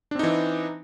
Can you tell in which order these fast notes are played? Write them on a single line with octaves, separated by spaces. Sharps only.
D4 C4 D#4 E3